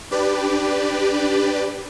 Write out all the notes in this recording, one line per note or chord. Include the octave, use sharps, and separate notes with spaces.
D4 G4 B4 D5